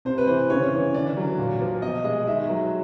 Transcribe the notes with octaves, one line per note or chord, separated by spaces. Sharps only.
C3 C5
B4
E3 C5
C#3 C#5
E3
D3 D5
F#3
A#2
F3
B2 D#5
G#3 D#5
D#3 E5
F#3